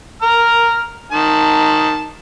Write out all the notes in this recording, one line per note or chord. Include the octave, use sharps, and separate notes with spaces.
A#5 F6
D#3 A5